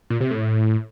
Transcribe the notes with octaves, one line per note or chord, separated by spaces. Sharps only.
A#2
C3
A2